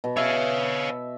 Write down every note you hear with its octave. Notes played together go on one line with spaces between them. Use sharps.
B2
C#5 E5 F5